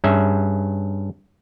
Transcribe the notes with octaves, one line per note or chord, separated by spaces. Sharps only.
G2 C#4 G#4 E5